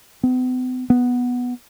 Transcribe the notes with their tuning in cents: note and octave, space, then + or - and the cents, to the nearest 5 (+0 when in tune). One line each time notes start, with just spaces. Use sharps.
B3 +45
B3 -5